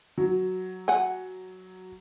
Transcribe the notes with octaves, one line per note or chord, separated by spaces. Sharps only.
F#3
F#5 G#5